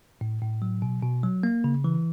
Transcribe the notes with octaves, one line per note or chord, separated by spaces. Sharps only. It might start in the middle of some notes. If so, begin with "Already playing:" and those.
A2
A2
F#3
B2
B2
F#3
A#3
C#3
E3